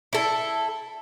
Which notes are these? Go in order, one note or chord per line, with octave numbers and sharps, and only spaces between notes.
E4 A4